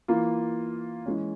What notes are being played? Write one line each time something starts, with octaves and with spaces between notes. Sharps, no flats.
E3 A#3 F4
E3 G#3 C#4